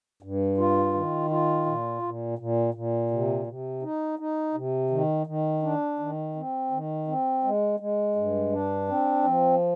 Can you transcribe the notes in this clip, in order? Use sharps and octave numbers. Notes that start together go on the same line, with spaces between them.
G2
F4
D#3
F4
A#2
A#2
A#2
A#2
C3
C3
D#4
D#4
C3
D#3
D#3
D4
D#3
C4
D#3
C4
G#3
G#3
G2
D4
C4
F3